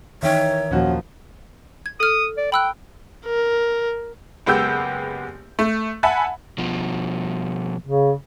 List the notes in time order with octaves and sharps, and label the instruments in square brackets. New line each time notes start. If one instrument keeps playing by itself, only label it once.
[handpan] D#3 E3 D#4 [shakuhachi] C#5 [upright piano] E5 G5
[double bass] D#2 F3 [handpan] A#2 F4 [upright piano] C#4 F#4
[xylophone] G#6
[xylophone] A4 F6 [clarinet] D#6
[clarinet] D5
[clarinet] G5 [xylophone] B5 E6 F#6
[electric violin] A#4
[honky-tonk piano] F#1 G#3 B3 G4 E6 G6
A3
E5 F#5 G#5 A5 B5
[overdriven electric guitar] B2 F3
[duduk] C#3